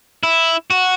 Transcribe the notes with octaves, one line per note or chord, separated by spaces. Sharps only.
E4
F#4